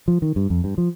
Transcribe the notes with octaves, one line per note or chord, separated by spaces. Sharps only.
F3
D#3
G2
F2
G2
F3